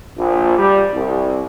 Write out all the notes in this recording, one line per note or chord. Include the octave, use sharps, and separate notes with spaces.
A#1
G3
C2